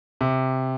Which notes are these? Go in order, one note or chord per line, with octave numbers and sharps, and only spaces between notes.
C3